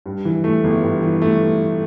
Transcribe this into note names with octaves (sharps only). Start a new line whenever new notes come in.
G2
E3
A3
G1
G2
E3
A3